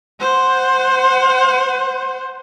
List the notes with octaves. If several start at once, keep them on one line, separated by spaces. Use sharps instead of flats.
C5 F#5